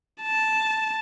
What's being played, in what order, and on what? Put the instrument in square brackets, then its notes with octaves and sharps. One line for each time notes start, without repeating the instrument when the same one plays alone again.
[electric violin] A5